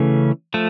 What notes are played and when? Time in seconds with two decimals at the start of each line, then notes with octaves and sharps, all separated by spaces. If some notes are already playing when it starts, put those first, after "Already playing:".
Already playing: C#3 E3 A3 C#4
0.54 F3 A3